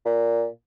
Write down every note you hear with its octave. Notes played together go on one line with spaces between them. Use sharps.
A#2